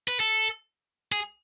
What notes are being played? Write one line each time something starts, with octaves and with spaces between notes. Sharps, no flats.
B4
A4
G#4